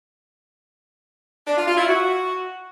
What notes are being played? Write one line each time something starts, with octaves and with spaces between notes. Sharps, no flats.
D4
F4
F4
E4
F#4